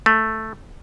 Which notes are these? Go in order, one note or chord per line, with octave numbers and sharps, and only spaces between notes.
A3